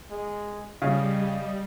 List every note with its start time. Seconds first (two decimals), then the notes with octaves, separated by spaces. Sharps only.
0.10 G#3
0.82 C#3 G3 D#5